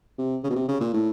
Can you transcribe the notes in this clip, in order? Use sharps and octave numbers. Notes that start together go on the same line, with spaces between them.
C3
C#3
B2
C3
C#3
A#2
A2